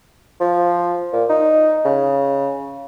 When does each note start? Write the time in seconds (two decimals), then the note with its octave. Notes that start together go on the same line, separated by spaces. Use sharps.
0.40 F3
1.13 A#2
1.30 D#4
1.85 C#3